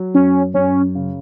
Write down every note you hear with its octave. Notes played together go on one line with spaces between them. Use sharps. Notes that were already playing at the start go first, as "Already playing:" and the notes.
Already playing: F#3
F#2 C#4
F#2 C#4
C#3